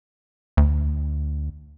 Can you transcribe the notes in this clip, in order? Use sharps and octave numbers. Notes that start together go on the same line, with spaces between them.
D2